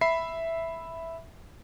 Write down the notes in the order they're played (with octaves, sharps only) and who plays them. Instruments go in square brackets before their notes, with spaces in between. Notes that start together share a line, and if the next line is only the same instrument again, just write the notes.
[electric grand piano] E5 B5 C7